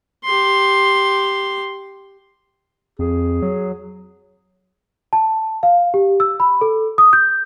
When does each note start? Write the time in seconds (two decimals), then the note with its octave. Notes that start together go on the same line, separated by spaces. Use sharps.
0.24 G4 C6
2.99 F2 G#4
3.42 F#3
5.13 A5
5.63 F5
5.94 G4
6.20 E6
6.40 B5
6.61 A4
6.98 D#6
7.13 G6